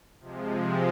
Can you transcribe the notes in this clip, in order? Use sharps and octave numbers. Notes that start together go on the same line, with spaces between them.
C3 F3 G#3